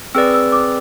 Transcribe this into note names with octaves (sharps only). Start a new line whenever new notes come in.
C4 G#4 B4 D5 E6
E6
D6